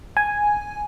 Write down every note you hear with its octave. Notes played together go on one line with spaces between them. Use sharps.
G#5